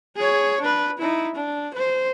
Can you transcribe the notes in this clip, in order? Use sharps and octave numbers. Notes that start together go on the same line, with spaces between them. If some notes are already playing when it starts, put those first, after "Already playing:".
G#4 C#5
D4 B4
D#4 E4
D4
C5